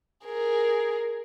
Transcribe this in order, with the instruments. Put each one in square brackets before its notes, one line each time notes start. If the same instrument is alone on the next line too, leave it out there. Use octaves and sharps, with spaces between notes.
[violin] G#4 A#4